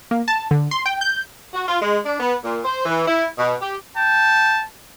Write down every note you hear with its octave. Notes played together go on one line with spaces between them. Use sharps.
A#3
A5
D3
C6
G5
G6
F#4
F4
G#3
D4
B3
A#2
C5
E3
E4
B2
G4
G5 A5